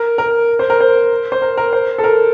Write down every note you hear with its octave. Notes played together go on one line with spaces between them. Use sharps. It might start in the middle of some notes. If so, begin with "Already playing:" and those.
Already playing: A#4
A#4
C5
A#4
C5
C5
A#4
A#4
C5
A4
A#4